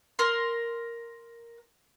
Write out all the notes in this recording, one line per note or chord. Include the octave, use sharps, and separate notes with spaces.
A#4 C6